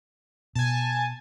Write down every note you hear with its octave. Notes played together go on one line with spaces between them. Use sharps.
B2 G#5 A5